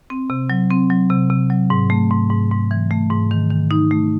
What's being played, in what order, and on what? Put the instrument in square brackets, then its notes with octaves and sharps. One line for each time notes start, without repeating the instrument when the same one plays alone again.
[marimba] C4
C3
F#3
C4
F#3
C3
C3
F#3
G#2
A3
G#2
G#2
G#2
E3
A3
G#2
D#3
D#3
D#4
A3